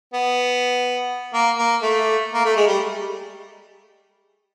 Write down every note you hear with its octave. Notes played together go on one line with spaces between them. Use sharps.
B3
A#3
A#3
A3
A#3
A3
G#3
G3